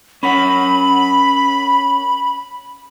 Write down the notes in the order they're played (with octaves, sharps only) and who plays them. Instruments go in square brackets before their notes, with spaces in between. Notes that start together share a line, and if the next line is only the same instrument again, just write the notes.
[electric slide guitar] C#4 A#4 F#5 [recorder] B5